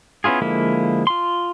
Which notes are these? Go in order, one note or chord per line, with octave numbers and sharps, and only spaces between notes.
B3 C#4 E4 F4 G#4
D3 F3 G#3 A#3 E4
F4 C6